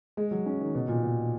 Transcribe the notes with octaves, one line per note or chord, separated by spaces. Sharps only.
G#3
F#3
C#4
D#3
B2
A#2
B2